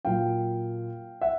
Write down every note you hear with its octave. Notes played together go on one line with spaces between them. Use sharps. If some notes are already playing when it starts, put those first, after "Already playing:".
A#2 F#3 F5 G5
E5 F#5